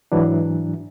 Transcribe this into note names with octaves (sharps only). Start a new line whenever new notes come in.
G#2 E3 F#3 D4